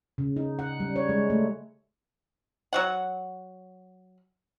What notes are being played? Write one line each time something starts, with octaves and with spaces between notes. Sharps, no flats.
C#3
D#4
F#5
G3
C#5
G#3
A3
F#3 F#4 F#5